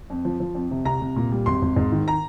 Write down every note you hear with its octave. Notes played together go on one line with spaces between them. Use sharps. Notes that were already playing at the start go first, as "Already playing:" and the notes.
F2
F3
F3
F2
C3
C2 A#5
C2
A#2
G3
G#1 C6
G#1
G#2
D#3
A#5